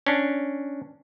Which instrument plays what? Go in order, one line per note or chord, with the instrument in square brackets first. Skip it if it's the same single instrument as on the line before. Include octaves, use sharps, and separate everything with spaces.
[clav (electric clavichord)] C#4 D4